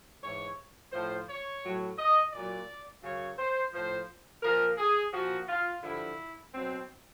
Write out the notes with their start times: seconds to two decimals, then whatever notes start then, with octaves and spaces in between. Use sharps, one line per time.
0.22 G#2 E3 C#5
0.92 A2 F3 C5
1.28 C#5
1.62 A2 F#3
1.97 D#5
2.32 A#2 F#3 D5
3.03 F#2 C#3 F#3 C#5
3.38 C5
3.73 A2 F3 C5
4.43 A#2 F3 A#4
4.78 G#4
5.13 A#2 F3 F#4
5.48 F4
5.83 G2 D3 F3 E4
6.53 B2 F#3 C4